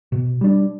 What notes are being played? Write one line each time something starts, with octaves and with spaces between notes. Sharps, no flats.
B2
G3 D4